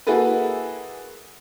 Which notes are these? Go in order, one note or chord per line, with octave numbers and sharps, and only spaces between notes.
A#3 E4 F#4 G#4 A4 B4